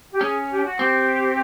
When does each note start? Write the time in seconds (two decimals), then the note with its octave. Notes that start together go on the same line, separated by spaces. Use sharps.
0.12 G4
0.21 C#4 G#4
0.50 G4
0.64 F#4
0.79 C4 G4